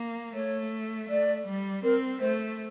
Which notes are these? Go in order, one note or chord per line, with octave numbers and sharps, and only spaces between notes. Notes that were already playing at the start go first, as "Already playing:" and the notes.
Already playing: A#3
A3 C#5
A3 D5
G3
C4 A#4
A3 C5